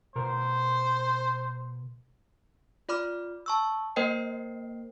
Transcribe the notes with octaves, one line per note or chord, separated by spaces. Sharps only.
B2 A#4 C5
F4 D5 B5 D6 F6
A5 C#6 E6
A#3 A#4 C5 D#5 G5 C7